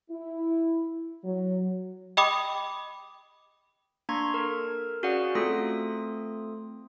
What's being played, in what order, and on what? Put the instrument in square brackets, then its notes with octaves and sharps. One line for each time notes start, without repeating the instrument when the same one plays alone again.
[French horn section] E4
F#3
[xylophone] D#5 G5 B5 D6 D#6
[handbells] A#3 D4 A#5 C6 C#6 G#6
A4 A#4
C#4 F#4 G#4 D5 F5 F#5
A3 C4 F4 A4 D#6